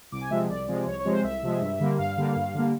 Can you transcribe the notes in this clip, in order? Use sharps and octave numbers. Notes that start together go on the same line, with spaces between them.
C2 D6
G#5
C3 F3 G#3 E5
C2 D5
C3 F3 G#3
C2 C#5
C#5
C3 F3 G#3
C5
C2 E5
C3 F3 G#3
G2
D3 G3 A#3
G2 F5
D3 G3 A#3
G2
D3 G3 A#3